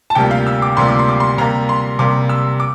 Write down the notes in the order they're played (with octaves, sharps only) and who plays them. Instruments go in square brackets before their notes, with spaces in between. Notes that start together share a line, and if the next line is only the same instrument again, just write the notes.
[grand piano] A5
D2 C3 G3 A#3 F4 G5
F5
E6
D6
D2 C3 G3 A#3 F4 C6
D6
C6
D6
C6
C3 G3 A#3 A#5
C6
C3 G3 A#3 D6
E6
D6